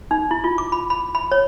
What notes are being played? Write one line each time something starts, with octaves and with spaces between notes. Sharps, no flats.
D#4
E4
F4
D6
B5
B5
B5
C#5